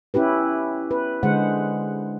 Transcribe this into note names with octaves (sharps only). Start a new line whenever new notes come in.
C#4 E4 G4 B4
B4
D3 G#3 C5 F#5